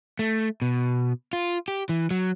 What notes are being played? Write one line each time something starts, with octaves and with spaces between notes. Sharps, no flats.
A3
B2
F4
G4
E3
F#3